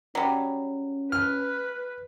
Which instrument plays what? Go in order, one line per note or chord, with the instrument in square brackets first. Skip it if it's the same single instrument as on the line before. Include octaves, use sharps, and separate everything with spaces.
[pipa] F#3 G3 [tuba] C#4
[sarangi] B4 [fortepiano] F6